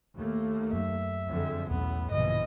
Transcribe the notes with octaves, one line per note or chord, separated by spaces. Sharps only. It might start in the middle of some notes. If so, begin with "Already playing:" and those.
D#2 A3 A#3
F#2 F#3 E5
F2 D3 G#3
B1 E2 A2 B3 C#4
A#1 G2 B2 D3 E3 D#5